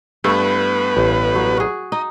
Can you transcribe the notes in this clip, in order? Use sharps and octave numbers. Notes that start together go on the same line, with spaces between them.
G2 A3 B3 E4 B4
A1
F#3
F#4 G#4
D#4 D#5